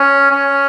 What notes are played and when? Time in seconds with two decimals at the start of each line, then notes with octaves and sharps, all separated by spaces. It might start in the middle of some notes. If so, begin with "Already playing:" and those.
Already playing: C#4
0.31 C#4